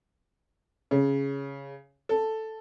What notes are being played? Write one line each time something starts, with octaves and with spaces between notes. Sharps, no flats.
C#3
A4